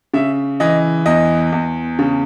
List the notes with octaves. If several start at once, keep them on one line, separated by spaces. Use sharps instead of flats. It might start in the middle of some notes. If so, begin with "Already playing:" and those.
C#3 E5
E3 D#5
E2 D#5
E2
C#3